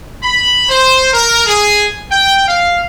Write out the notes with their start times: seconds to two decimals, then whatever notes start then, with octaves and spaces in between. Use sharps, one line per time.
0.22 B5
0.69 C5
1.13 A#4
1.46 G#4
2.11 G5
2.48 F5